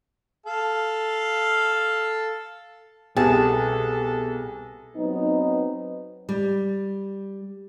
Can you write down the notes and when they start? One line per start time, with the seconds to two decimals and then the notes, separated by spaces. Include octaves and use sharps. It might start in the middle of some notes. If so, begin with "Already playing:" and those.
0.46 A4 F5
3.17 C2 B2 B3 G#4 A4 A5
4.97 F#3 B3 C4 D#4
6.29 G3